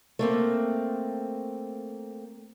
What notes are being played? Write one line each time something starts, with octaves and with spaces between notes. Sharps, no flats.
A3 A#3 C4